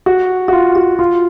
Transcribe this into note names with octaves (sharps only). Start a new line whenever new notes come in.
F#4
F#4
F4
F#4
F4